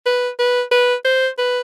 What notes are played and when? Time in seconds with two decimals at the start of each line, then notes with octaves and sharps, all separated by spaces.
0.06 B4
0.39 B4
0.72 B4
1.05 C5
1.38 B4